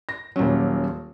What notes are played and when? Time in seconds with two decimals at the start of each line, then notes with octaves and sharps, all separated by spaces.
0.09 A#6
0.36 D#1 A#2 F#3 C#4